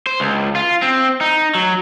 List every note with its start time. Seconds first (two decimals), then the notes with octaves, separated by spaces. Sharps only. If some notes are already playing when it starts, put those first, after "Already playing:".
0.07 C5
0.20 C#2
0.56 F4
0.82 C4
1.21 D#4
1.55 F#3